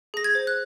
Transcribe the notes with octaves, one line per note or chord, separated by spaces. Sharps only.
G#4 A#6
G#6
C5
F#6